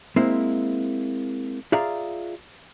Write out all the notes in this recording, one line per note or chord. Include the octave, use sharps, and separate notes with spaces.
G#3 A#3 C4 E4
F4 G#4 D5 E5 F5 A#5